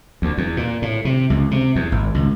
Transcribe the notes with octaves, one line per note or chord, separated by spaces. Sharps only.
D2
E2
A#2
A2
C3
C#2
C3
E2
G#1
C#2